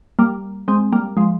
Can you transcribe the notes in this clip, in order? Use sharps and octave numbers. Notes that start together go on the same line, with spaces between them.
G3 A#3
G#3 C4
G3 A#3
F3 G#3